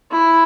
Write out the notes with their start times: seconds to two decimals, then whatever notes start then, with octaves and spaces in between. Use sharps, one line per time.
0.11 E4